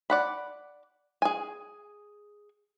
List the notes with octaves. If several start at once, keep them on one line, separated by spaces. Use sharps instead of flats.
D5 F#5 B5
G#4 G#5